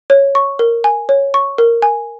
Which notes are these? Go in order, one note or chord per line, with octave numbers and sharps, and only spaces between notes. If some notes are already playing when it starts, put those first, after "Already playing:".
C#5
C#6
A#4
G#5
C#5
C#6
A#4
G#5